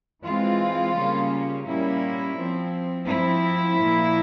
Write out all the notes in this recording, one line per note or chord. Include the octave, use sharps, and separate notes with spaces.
E3 G#3 C4 F4
C#3 G3 A#3 C#4
A#2 G3 A#3 C#4 E4
F3 C4
F3 C4 E4
A#2 F3 A#3